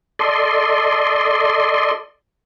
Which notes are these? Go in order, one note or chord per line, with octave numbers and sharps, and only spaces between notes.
A4 D5 D#5 C6